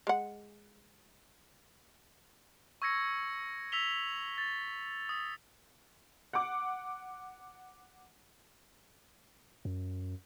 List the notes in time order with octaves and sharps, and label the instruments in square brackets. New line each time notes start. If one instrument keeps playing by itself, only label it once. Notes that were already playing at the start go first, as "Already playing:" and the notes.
[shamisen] G#3 F#5
[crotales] C#6 E6 G#6 A#6 C#7
E6 B6 F7 G7
A6
D#6
[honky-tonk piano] F#5 D6
[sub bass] F#2